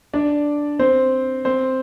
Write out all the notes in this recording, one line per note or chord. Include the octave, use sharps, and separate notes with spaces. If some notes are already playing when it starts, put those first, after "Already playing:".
D4 D5
C4 C5
C4 C5